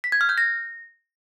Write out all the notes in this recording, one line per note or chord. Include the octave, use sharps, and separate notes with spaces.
B6
G#6
F6
G6
A#6